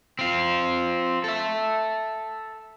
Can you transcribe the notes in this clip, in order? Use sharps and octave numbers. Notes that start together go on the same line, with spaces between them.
C4 F4
A4 E5